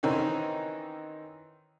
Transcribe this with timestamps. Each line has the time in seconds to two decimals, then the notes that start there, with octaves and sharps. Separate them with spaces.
0.03 D#3 E3 C4 C#4 D#4